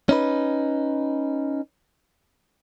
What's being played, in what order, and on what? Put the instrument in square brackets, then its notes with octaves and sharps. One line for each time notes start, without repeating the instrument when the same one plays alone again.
[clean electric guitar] C#4 D#4 B4